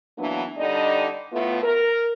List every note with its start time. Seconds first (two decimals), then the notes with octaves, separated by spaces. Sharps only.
0.18 E3 F#3 A#3 B3 D4
0.57 D3 G3 D4 D#4 D#5
1.33 A2 A3 B3 E4 F4
1.63 A#4